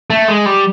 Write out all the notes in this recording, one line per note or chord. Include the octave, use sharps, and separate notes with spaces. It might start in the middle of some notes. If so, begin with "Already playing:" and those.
A3
G#3
G3